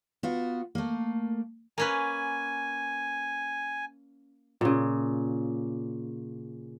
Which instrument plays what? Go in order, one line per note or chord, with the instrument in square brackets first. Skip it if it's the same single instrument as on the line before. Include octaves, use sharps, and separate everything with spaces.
[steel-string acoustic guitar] B3 F4 F#4
A3 A#3
[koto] A#3 C#4 B4 [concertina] G#5
[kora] A#2 C#3